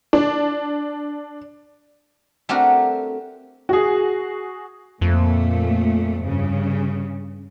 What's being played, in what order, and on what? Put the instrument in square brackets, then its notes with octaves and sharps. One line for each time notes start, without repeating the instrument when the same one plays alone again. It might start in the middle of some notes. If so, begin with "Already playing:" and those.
[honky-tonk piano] D4
[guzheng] A3 C4 D4 F#4 G4 A#4
[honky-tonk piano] F#4 G#4
[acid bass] F2 [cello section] A#2 A3
[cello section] G2 C#3